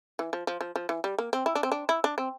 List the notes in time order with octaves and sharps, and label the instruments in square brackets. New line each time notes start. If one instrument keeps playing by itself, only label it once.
[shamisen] E3
F3
F3
F3
F3
E3
G3
A#3
C4
E4
D4
C4
D4
E4
D4
C4